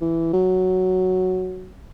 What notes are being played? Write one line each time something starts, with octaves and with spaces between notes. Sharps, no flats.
E3
F#3